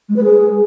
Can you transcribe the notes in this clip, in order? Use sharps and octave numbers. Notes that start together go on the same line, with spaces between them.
G#3
B4
G#4